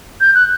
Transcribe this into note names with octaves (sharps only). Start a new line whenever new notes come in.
G6
F#6